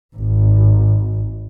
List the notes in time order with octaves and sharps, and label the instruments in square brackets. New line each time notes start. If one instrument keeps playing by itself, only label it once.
[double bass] G#1